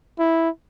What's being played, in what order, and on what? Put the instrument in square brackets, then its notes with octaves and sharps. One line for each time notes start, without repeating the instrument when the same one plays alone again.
[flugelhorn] E4